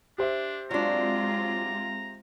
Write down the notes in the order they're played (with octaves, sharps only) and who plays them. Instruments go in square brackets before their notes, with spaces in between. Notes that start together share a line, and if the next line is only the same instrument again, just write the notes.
[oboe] D4 [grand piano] G4 C5 E5
[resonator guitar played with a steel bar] F#3 D4 [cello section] G#3 C4 F4 [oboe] A#5